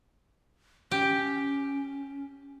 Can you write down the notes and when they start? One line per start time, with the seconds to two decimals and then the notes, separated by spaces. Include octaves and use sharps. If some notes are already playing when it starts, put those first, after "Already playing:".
0.91 C#4 G4